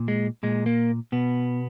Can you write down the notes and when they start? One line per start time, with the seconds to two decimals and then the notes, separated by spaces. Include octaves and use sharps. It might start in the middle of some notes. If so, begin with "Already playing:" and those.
Already playing: A#2
0.08 G#3
0.43 A#2 G#3
0.66 A#3
1.12 B2 B3